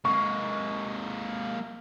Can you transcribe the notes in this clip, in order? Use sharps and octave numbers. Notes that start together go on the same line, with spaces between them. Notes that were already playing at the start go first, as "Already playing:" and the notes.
G#3 A#3 C#6